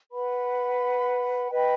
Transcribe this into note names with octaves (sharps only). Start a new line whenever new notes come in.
B4 F#5 B5
B4 D#5 G5 B5